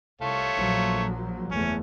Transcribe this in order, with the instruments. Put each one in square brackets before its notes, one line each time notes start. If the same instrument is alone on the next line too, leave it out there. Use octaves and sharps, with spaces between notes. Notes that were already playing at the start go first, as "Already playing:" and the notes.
[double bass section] C2 [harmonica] A3 F4 C#5
[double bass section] A#1 F3 F#3
[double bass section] F#1 E2 A3 [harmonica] C#4